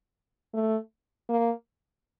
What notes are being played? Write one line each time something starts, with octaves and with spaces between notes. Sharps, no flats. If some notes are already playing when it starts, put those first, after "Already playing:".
A3
A#3